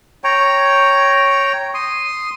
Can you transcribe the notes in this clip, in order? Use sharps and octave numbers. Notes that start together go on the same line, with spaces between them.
C#5 G5 A#5
C6 D#6